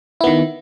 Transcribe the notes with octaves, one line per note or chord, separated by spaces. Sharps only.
D#3 B3 E4